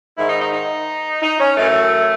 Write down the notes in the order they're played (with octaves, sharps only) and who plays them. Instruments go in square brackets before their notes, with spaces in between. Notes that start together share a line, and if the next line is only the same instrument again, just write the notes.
[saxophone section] G#2 D#3 E4
D#4
D#4
D#4
D#4
C#4
F#2 E3 A3